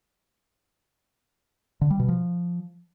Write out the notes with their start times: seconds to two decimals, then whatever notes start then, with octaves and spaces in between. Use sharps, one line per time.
1.81 D3
1.90 G3
1.99 B2
2.08 F3